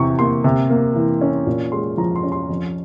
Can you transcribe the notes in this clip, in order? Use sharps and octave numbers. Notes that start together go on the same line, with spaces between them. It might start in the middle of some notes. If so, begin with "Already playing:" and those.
Already playing: E2 C3 E3 C#6
A#3 C6
C3
A#3
E3
C#4
A#2
G#3 C6
F3 A#5
C6
C#4
C6
F2